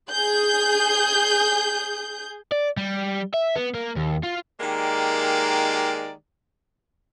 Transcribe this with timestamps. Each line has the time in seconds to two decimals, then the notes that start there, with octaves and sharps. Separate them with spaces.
0.11 G#4 G6
2.52 D5
2.77 G3
3.34 E5
3.56 B3
3.74 A#3
3.96 D#2
4.23 F4
4.60 D#3 G#3 A#3 G4 A#4 D5